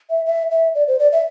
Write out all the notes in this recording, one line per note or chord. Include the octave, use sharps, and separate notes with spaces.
E5
E5
E5
D5
C5
D5
E5